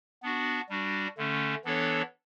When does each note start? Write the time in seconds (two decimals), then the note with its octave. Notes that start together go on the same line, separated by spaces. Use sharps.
0.22 B3 D4 F#4
0.69 G3 D4 F#4
1.17 D3 A3 C#4
1.64 E3 B3 D4 A4 C#5